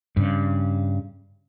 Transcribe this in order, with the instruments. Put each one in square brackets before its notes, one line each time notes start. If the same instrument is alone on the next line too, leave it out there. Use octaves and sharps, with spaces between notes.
[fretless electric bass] G2 C#3